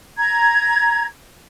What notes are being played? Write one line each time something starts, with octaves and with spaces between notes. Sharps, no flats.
A#5 G#6